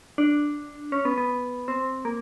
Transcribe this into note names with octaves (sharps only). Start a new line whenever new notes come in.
D4
C#4
B3
B3
C4
A#3